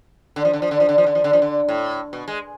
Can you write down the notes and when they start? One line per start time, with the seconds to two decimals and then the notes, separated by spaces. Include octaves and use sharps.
0.36 D3
0.45 F3
0.53 D3
0.62 F3
0.71 D3
0.80 F3
0.89 D3
0.98 F3
1.06 D3
1.15 F3
1.24 D3
1.33 F3
1.42 D3
1.69 A2
2.13 B2
2.28 G#3